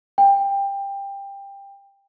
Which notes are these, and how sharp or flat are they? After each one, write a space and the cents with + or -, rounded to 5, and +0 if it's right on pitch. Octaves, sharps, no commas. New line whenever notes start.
G5 +20